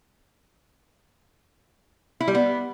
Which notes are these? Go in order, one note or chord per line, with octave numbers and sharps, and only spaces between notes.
E4
G3
B3